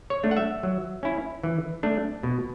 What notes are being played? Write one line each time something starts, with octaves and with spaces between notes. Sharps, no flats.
C#5
A3 D4
F#5
E5
F#3
C#4 E4
E3
A3 D4
B2